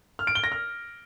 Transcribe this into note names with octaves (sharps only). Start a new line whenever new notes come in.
F6
D7
G7
A#6
F6